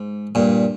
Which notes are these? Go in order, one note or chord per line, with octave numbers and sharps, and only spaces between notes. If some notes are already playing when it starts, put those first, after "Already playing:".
Already playing: G#2
G2 A#2